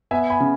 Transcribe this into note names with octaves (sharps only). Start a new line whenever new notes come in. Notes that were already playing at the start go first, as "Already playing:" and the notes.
B3 E5 G#5
G#5 B5
C#3